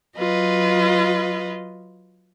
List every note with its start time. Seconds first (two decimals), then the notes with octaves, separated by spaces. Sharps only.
0.17 F#3 F4 B4 D#5